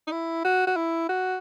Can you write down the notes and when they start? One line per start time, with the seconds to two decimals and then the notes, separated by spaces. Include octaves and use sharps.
0.07 D#4
0.12 E4
0.45 F#4
0.67 F#4
0.76 E4
1.09 F#4